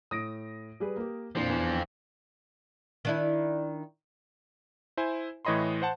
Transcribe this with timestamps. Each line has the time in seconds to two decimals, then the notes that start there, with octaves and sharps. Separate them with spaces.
0.11 A2 D#6 A#6 D7
0.80 G3 G#4 B4
0.96 A#3 G4
1.35 F2 A#2 E3 F3 C4 D4 C5
1.49 E2
3.05 D#3 D4 E4
4.97 E4 C5 G#5
5.45 A2 E3 C#5 D#5 B5 C6
5.82 C5 F#5 A5